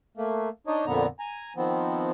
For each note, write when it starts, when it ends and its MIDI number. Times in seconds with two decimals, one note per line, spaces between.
0.17 0.49 57
0.17 0.49 58
0.67 0.85 62
0.67 0.85 63
0.67 0.85 73
0.67 0.85 75
0.86 1.06 41
0.86 1.06 46
0.86 1.06 50
0.86 1.06 59
0.86 1.06 82
1.19 1.53 80
1.19 1.53 82
1.57 2.11 51
1.57 2.11 53
1.57 2.11 59
1.57 2.11 60